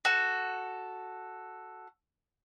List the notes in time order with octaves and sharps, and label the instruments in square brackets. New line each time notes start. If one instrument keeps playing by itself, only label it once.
[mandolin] F#4 A4